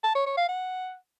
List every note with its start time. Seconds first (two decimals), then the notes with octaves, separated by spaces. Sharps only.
0.04 A5
0.15 C#5
0.26 C#5
0.38 F5
0.49 F#5